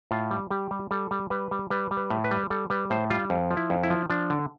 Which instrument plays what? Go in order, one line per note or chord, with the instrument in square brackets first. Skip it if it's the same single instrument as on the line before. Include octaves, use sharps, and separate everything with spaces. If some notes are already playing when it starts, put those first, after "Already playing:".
[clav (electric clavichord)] A2 F4
G3
G3 G4
G3
G3 A4
G3
G3 B4
G3
G3 B4
G3
B4
A2
B4
G3
G3 A4
G3 B4
A2 C5
G3 F4
F2
F3
E4
F2
E4
F3
F3 D4
D3